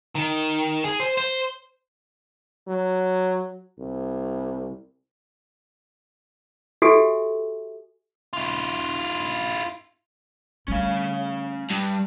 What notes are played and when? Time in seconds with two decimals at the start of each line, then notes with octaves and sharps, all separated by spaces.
0.15 D#3
0.84 G#4
1.00 C5
1.17 C5
2.68 F#3
3.79 C2
6.82 F#4 G4 A4 E5 G#5
8.33 E4 F4
10.68 G3 A3 C#4 F5
11.70 G2